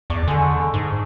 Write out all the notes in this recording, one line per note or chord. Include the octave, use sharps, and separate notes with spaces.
E2 D5 A5 C#6
D3 G#3 A3
G#2